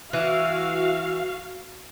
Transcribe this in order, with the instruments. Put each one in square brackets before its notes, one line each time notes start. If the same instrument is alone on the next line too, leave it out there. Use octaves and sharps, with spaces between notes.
[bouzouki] E3 [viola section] F#4 F5